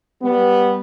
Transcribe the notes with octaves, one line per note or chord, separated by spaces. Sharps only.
G3 B3